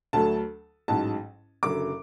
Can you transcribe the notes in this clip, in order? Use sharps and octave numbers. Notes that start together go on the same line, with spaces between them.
D2 D3 F#3 A3 A5
A1 G#2 F#3 A5
F#1 F#2 D3 F#3 D6